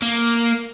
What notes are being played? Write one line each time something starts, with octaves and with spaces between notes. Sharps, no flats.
A#3